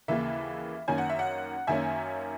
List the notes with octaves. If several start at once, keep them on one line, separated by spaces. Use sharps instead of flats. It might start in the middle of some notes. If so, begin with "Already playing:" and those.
D#2 C#3 E3 A#3 E5
F#2 D#3 A#3 C#4 G#5
F#5
E5
F#5
F#2 D#3 A#3 C#4 E5 G#5